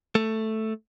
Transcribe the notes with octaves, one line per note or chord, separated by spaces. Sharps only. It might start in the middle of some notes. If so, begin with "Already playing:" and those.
A3